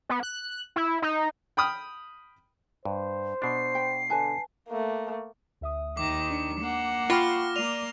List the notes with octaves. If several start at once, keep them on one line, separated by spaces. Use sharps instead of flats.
B3
F#6
E4
D#4
G5 B5 D#6 F6
G2 C5
B2 D4 C7
G5
D3 B4 G#5 A5
A3 A#3
D2 E5 D#6
D#2 D#3 D6
D4 C#7
A#3 F#5
F4 G5 B5 C#6 F6 A#6
A#3 D5 D#7 F7